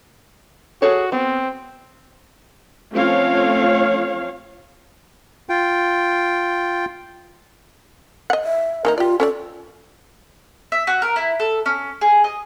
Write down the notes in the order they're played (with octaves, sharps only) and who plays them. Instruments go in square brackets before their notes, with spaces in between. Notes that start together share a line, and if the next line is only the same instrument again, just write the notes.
[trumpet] F#4 [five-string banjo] G#4 A4 C#5
[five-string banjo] B3 [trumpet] C4
[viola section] F3 A3 C4 C#4 C#5 F5
[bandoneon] F4 G5
[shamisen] D#5 F#5
[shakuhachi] E5
[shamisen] D#3 A#3 D#4 [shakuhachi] A#4
[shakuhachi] F4 [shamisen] G4 D5
[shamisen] C#4 C#5 D5 [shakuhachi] A4
[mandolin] E5
F#4
A#4
E4
A4
C#4
G#4
D#5